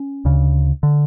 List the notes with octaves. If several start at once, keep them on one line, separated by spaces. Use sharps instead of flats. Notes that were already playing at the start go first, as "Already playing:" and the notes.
Already playing: C#4
D2 C#3
D3